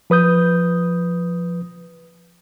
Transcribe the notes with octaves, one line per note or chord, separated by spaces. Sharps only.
F3 B4 D#6 G6